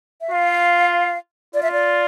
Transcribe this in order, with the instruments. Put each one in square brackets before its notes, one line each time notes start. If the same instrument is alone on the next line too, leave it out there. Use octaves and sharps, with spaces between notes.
[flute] E5
[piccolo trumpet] F4 [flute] F5
[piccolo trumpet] F4 [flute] D5
[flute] E5
D5